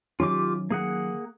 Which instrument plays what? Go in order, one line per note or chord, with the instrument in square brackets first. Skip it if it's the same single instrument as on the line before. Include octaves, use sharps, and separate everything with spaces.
[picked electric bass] D#3 F#3 C#4 [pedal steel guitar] F4 G4 D6
[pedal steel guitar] A#3 G#4 F#5